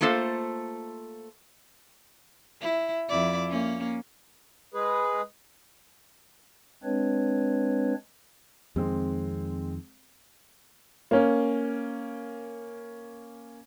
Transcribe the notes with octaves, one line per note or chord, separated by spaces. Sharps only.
A3 A#3 F4 A4 C5
E4
F2 E4 D5
A#3 C#4
G#3 G#4 B4
G#3 C4 D4 B4 C#5
F2 D#3 G#3 C4
A#3 C#4